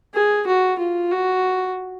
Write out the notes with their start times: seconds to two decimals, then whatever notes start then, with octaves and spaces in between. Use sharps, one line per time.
0.14 G#4
0.47 F#4
0.79 F4
1.11 F#4